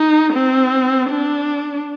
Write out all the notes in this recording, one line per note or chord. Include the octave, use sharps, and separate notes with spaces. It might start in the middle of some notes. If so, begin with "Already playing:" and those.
Already playing: D#4
C4
D4